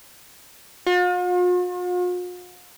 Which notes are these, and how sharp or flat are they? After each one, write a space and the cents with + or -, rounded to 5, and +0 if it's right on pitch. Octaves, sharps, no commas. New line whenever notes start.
F4 +45